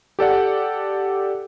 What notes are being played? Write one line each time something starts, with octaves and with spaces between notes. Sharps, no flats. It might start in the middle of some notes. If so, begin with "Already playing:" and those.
G4 A4 D5 F#5